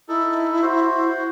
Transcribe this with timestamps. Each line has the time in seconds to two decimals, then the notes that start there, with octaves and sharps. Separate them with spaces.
0.08 D#4 E4 A4
0.62 F#4 C5